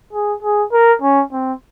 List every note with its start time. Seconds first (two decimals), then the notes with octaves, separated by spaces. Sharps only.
0.13 G#4
0.43 G#4
0.73 A#4
1.02 C#4
1.32 C4